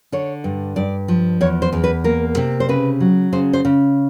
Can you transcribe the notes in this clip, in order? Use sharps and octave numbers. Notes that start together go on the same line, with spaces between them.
D3 C#5
G2
G2 D5
F3
E2 C#5
C5
E2
B4
A#3 A#4
C3
C5
C#3 B4
F#3
C#3 C5
C5
C#3